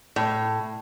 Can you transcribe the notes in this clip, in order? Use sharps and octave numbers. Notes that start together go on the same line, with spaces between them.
A2